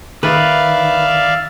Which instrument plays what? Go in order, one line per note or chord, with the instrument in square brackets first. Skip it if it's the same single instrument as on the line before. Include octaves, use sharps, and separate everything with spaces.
[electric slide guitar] D#3 [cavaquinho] B4 [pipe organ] D5 E5 F5